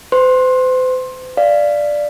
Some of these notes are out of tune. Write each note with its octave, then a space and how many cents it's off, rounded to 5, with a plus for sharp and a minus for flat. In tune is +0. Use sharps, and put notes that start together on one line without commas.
C5 -40 C6 +20
D5 +5 F5 -15